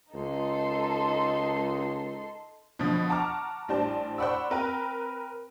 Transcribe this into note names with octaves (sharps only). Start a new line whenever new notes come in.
C#2 D#4 A4 C6
B2 D3 F3
F#5 A5 A#5 C#6 D6 F6
A1 G3 D4 C5 A5
C5 D5 F#5 B5 C#6 E6
C4 A#4 B4 G5